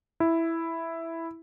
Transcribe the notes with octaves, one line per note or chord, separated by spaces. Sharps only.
E4